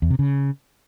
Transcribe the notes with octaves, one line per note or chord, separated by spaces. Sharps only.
E2
C3
C#3